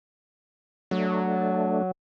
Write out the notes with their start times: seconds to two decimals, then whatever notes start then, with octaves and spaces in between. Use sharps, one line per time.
0.91 F#3 A3 D4